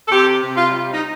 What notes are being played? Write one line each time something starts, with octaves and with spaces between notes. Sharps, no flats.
A4
C3 G4
C3
F4
G3
D#4